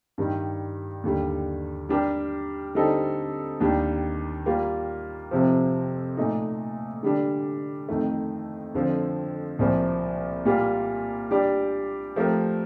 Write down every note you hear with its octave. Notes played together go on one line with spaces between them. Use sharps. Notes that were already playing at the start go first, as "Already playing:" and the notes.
G2 D#3 G3
D#2 D3 G3
G3 D4 G4 A#4
D3 G3 C4 D#4 A4
D#2 D#3 G3 D4
G3 A#3 F4
F2 C3 F3
A#2 A3 D#4
D3 G3 D4
F2 D#3 A3
F2 D3 F3
C2 A#2 F3 A#3
A#2 G3 A#3 F4
G3 D4 G4 D5
F3 A3 C4 G4 A#4